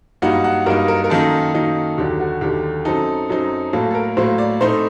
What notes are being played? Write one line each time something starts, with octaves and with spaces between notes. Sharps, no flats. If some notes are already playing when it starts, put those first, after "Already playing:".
G2 F#3 A#3 D#4 F#5
F#5
G2 F#3 A#3 D#4 A#4
A#4
A#4
F#2 D#3 F#3 A#3 D#4 A4
F#2 D#3 F#3 A#3 D#4
D#2 D3 F#3 G4
F#4
D#2 D3 F#3 G4
F#2 F#3 C4 D#4 A4
F#2 F#3 C4 D#4
A2 F#3 A#3 A4
A4
A#4
A2 F#3 A#3 C5
D5
A2 A3 C4 D#4 C5